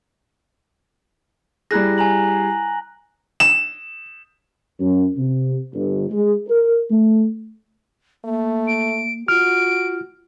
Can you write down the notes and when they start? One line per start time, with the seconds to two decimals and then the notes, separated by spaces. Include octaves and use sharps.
1.71 G3 E4 G#4 A#5 F#6 A#6
1.98 G#5 A#5 F#7
3.40 E7
4.79 F#2
5.16 C3
5.73 G1
6.09 G#3
6.48 A#4
6.89 A3
8.25 A3 A#3
8.68 D7
9.28 F4 F#4 F6 D7